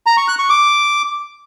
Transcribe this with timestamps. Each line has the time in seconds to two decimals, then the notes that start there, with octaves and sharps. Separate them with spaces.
0.06 A#5
0.17 C#6
0.28 F#6
0.39 C#6
0.50 D6